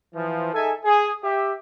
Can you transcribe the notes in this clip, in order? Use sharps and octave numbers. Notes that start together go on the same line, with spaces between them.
E3 F3
D#4 G#4 A4 E5 G#5
G#4
G4 E5